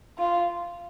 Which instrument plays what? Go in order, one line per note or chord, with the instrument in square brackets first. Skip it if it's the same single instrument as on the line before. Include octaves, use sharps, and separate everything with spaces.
[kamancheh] F4